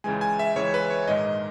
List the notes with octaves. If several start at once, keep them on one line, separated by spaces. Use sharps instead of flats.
C#2 C#3 E3 G#3 G#5
G#5
E5
C#2 C#3 E3 G#3 C#5
B4
C#5
A#1 G#2 D#3 G#3 D#5